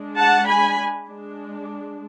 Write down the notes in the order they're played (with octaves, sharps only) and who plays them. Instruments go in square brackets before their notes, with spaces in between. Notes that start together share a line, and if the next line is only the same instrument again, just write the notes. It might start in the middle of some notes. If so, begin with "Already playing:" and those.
Already playing: [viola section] G#3 D4
F#5 A5
G#5 B5
G#3 D4